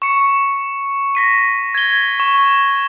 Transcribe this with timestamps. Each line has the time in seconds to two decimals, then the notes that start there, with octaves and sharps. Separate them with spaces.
0.02 C#6 C#7
1.15 A#6 B6 D#7
1.75 G#6 G7
2.20 C#6